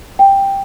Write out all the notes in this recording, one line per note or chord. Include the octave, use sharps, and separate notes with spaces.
G5